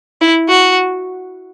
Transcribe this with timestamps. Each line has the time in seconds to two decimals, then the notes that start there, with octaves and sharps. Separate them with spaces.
0.21 E4
0.49 F#4